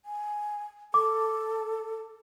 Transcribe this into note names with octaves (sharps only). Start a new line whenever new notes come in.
G#5
A4 D6